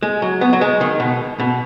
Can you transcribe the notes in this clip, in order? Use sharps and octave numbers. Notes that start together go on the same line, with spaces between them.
G#3
F#3
B3
F#3
G#3
D#3
B2
B2